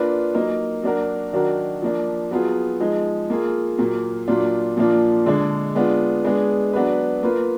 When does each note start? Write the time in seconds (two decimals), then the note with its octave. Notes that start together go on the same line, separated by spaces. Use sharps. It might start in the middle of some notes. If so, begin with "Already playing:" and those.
Already playing: A#3 D4 F4 B4
0.34 F#3 A#3 D#4 A#4
0.83 F#3 A#3 D4 F#4 A#4
1.33 D#3 F#3 D4 F#4 A#4
1.82 F3 A#3 D4
2.31 F#3 B3 F4 G#4
2.80 F3 G#3 D#4 G#4
3.30 A#3 F4 G#4
3.78 A#2 F#3 A#3
4.28 A#2 F#3 D4 F4
4.77 A#2 F3 A#3 D4 F4
5.26 D3 G#3 D4 G#4
5.75 G#3 B3 D4 F4
6.24 G#3 B3 D4 G#4
6.73 F#3 B3 D4 F#4 B4
7.23 A#3 F4 B4